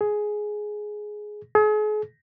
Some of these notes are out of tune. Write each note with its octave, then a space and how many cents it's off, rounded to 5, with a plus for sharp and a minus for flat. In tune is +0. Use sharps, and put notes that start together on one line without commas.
G#4 +10
G#4 +40